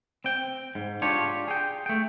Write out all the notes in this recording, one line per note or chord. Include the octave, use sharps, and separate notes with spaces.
C4 G5
G#2
D4 F4 G4 C#5
G#4 G5
A3 G5